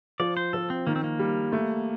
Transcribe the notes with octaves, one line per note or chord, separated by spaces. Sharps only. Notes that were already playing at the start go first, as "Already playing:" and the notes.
F3 D5
C5
F3 A4
C4
D#3 A#3
C4
A#3
G3
A3